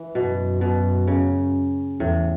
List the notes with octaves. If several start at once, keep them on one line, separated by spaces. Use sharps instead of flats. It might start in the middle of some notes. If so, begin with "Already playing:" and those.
Already playing: E3
F#2 B2
B2
C#3
E2 A2